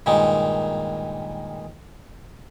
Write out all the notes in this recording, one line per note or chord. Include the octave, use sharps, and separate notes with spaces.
G2 A#2 D#3 G#3